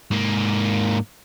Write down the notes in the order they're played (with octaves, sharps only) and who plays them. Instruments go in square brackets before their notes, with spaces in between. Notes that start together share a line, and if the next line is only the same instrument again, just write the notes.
[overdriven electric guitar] G#2 A#3